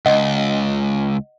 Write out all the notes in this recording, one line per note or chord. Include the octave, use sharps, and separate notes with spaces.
C#2 D#5 F#5